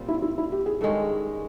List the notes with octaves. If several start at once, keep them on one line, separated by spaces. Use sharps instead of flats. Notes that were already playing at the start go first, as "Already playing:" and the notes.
Already playing: A#2 G3 C4 F4
E4
E4
E4
G4
G#4
G2 D#3 G#3 C#4 A4